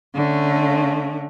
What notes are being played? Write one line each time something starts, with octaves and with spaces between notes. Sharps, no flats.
D3 A3 C#4